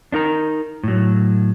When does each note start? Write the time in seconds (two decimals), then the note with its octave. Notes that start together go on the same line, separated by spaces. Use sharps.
0.12 D4 D#4 A#4 A#5
0.83 A2 F#3